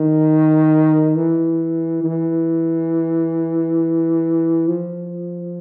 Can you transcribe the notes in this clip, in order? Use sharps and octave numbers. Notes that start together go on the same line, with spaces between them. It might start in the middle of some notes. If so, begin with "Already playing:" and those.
Already playing: D#3
E3
E3
F3